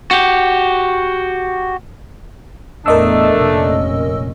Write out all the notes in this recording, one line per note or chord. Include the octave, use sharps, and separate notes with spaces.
F#4 G4
E2 A2 A3 D4 A#4 D#5 E6
F1 A#2 C#4